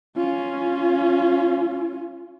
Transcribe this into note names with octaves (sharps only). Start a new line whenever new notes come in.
C#4 F4